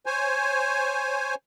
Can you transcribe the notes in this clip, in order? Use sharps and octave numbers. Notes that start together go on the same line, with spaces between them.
C5 C#5 G#5